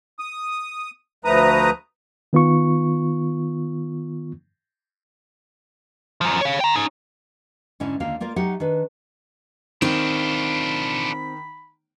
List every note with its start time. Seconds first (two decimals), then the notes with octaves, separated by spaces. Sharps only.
0.19 D#6
1.25 D2 F3 A3 B4 A#5 D#6
2.33 D#3 B3 F4 C#6
6.21 F#2 F3
6.41 C#5 F5
6.60 G5 A#5
6.74 C#4 D#4
7.80 G#2 D3 C#4 E4 E5
8.00 D#2 D3 A#3 F4 F5
8.20 A#3 F4 A#4 D5
8.36 F#3 D#4 G4 E5 F#5
8.60 D#3 D4 B4
9.82 D#3 C4 D4 F4 B5